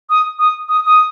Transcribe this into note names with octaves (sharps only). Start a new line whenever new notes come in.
D#6
D#6
D#6
D#6